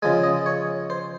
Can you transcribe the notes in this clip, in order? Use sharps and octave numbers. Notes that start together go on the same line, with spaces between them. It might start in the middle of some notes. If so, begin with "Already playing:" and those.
C#3 F3 G#3 G#5
D#5
C#5
C5